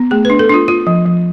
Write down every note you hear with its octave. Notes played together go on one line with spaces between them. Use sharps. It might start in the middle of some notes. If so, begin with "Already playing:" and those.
Already playing: B3
A3 G#4
D4 B4
A4
D4 F4
F4
F3
F3